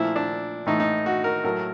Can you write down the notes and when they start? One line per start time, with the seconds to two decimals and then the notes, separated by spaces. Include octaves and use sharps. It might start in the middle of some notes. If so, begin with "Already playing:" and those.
Already playing: A#2 F3 A3 E4
0.16 D4
0.66 A2 E3 A3 D#4
0.80 D#4
1.06 F#4
1.24 A#4
1.44 A2 F#3 A3 A#4